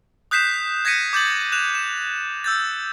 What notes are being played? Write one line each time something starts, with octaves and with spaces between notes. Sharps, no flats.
D#6 F#6 G6 B6 C7 E7
G6 G#6 A#6 B6 C#7 D#7
D6 G6 A6 F#7
F#6 E7 F7
E7
E6 G6 A6